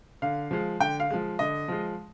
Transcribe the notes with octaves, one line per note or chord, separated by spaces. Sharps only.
D3 F5
F3 G#3
D3 G5
F5
F3 G#3
D3 D#5
F3 G#3